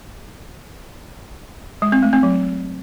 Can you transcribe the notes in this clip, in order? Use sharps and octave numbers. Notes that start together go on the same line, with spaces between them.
G#3
C4
A3
C4
F#3